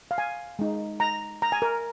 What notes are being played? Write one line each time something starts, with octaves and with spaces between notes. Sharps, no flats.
F5
G#5
G#3 D#4
A#5
A#5
G#5
A#4